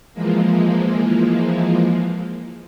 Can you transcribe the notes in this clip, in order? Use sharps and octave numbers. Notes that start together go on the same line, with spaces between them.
E3 F3 G#3 A#3